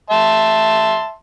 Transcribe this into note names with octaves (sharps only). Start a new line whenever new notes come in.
E5 A5 C6